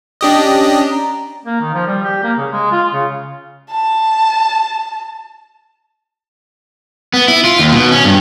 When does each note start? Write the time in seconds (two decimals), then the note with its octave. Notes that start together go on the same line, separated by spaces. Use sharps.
0.21 D4 G4 D#5
0.36 C#4
0.90 A#5
1.45 A#3
1.61 D#3
1.74 F3
1.87 G3
2.04 G4
2.23 A#3
2.37 C#3
2.52 G#3
2.72 F4
2.93 C#3
3.70 A5
7.14 B3
7.28 E4
7.44 F4
7.59 D#2
7.72 B2
7.91 C#4
8.04 G2